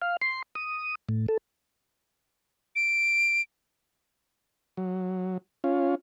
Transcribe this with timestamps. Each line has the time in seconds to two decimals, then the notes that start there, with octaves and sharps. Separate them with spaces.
0.02 F5
0.22 C6
0.55 D#6
1.09 A2
1.28 A4
2.76 D7
4.77 F#3
5.64 C#4 F4